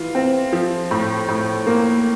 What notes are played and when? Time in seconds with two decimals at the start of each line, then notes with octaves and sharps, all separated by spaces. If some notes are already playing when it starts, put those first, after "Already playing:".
Already playing: E3 F4
0.15 C4
0.53 F3
0.91 A2
1.28 A2
1.67 A#3